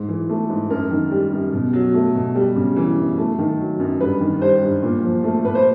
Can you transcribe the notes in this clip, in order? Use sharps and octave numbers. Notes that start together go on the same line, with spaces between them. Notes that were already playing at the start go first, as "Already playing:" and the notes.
Already playing: G#2
E3
A3
G#2
F#2 A#4
D#3
G3
F#2
B2
F#3
A3
B2
G3
C#3
E3
F#2
A3
D#3
F#3
F#2
G2 B4
D#3
G3 C5
G2
A#2
F3
A3
A#2 B4
C5